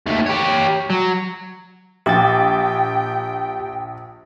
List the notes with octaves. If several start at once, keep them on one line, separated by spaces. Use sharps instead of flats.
D#2 A3
G4 C#5
F#3
A#1 G4 G5 A6